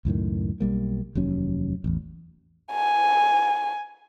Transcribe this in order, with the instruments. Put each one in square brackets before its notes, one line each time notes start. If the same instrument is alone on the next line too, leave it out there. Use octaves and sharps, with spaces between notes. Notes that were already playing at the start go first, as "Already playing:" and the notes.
[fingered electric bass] C#2 F#2 A2 D#3
B1 G3 A#3
F1 D#2 F#3 C#4
A1 E2
[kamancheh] G#5